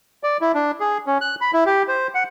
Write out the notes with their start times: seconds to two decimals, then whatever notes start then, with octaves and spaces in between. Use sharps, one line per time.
0.23 D5
0.41 E4
0.55 D4
0.80 G#4
1.07 C#4
1.21 F#6
1.41 B5
1.53 E4
1.66 G4
1.88 C5
2.15 F#5